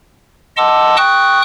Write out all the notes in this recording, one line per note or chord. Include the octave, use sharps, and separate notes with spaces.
D#5 F#5 A5 C6 D6 E6
G5 C#6 D#6 F#6